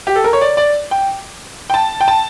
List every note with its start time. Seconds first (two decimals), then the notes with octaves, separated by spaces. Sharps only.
0.07 G4
0.16 A4
0.24 A#4
0.33 C#5
0.41 D5
0.57 D5
0.91 G5
1.70 G5
1.74 A5
2.01 G5
2.08 A5